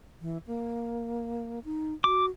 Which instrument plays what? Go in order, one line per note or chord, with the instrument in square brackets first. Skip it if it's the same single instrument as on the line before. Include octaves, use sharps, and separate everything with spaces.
[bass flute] E3
A#3
D#4
[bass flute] F#4 [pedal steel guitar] D6